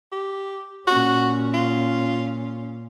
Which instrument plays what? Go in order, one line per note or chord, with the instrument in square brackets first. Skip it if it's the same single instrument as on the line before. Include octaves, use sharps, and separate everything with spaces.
[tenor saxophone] G4
[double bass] A#2 C#4 [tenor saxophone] F#4
[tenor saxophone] F4